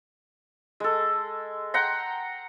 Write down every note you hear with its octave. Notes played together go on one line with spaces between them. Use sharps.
G#3 A4
F#5 G5 A#5 C6